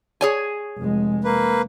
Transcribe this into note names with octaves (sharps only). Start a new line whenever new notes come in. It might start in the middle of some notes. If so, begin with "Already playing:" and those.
G#4 C#5 G#5
F1 G#3
A#3 B4